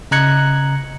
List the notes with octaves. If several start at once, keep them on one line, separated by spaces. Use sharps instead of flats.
C#3 D#5 A#5 F#6 G#6 C#7